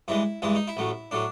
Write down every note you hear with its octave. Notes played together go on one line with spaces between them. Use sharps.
G2 E3 G#3 E4
G2 E3 G#3 E4
D#4
E4
A1 A2 F#3
A2 F#3 D4